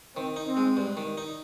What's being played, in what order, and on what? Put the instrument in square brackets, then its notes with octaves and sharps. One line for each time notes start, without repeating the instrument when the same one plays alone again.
[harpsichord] D#3 [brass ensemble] C4
[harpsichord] D#4
[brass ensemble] C4
[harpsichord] G#3
G2
D#3
D#4